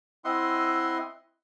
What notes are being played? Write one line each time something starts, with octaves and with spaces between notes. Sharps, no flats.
C4 E4 D#5 E5 F#5 C6